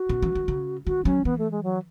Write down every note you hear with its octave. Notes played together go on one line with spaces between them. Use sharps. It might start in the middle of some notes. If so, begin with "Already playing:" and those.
Already playing: F#4
B2
E3
D#3
C#3
D#3 F#4
F#3 C#4
E3 B3
A3
G#3
F#3